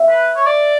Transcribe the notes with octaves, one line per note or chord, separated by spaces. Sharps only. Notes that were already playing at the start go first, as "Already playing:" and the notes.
Already playing: E5
B4
C#5
D5